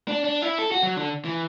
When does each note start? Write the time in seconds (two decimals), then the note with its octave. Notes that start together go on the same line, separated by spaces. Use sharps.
0.08 D4
0.25 D4
0.42 E4
0.59 A4
0.72 F#4
0.83 F#3
0.97 D3
1.25 E3